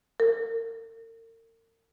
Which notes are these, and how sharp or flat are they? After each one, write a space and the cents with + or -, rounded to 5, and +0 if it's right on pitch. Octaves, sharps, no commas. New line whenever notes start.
A#4 -40